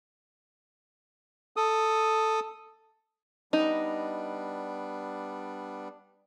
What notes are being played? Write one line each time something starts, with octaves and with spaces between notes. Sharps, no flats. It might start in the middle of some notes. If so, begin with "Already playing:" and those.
A4 D#6
G3 B3 D4 D#4